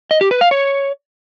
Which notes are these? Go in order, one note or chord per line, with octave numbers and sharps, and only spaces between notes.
D#5
G4
B4
F5
C#5